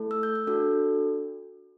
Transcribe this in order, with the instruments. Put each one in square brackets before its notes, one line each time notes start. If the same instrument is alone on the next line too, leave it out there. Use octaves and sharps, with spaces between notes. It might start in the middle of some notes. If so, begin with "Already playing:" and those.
Already playing: [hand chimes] A3 E4 A4
E6
G6
G6
D4 F#4 A4